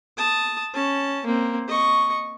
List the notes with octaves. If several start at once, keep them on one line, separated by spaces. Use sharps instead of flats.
A5 D#6
C#4 A5
A#3 C4
D#5 C#6